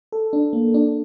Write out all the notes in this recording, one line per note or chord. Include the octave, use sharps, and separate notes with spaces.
A4
D4
A#3
D4